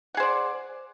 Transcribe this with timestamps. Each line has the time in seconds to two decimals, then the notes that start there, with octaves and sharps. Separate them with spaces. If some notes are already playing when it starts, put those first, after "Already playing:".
0.15 F#5
0.17 G#4
0.20 C5
0.23 D5